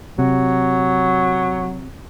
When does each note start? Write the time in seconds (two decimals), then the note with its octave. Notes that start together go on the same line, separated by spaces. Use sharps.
0.19 C3 F#3